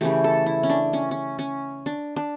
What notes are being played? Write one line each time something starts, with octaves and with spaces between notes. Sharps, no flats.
C#3 E3 A3 G4
A4
E4
C#4
D4
C#4
C#4
C#4
D4
D4